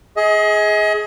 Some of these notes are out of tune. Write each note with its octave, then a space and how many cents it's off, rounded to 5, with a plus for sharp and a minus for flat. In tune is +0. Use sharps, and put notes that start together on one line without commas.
G#4 +10 D#5 +35